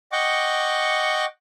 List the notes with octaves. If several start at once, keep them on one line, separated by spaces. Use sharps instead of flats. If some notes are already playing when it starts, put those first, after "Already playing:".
D#5 F#5 G5 C#6 D6